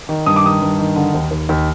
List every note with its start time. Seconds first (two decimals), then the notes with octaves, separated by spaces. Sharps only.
0.09 D#3
0.26 G2 D#6
0.36 D6
0.44 D#3 D#6
0.62 G2
0.79 D#3
0.96 D3
1.14 D#2
1.31 D#2
1.49 D#2